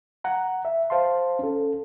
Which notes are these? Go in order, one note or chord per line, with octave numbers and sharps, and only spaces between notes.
F#5 A#5
E5
C5 F5 A5 C6
C#4 A4